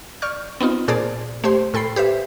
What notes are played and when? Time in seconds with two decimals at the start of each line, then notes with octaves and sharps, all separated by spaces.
0.22 D5 C#6 F6 G6
0.60 B3 C4 D#4 F4
0.88 A#2 G#4 C5 D5 A5
1.44 A3 G4 C5 C6
1.74 A2 A4 G5 B5 C7
1.96 G4 B4 C5 E5